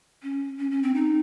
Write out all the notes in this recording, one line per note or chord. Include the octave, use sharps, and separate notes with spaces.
C#4
C#4
C#4
C4
D#4